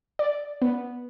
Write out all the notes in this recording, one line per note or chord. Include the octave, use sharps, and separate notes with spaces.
D5
B3